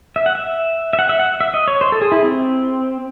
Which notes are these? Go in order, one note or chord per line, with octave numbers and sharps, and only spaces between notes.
E5
F#5
E5
E5
F#5
E5
F#5
E5
D#5
C#5
C5
A4
G#4
E4
C4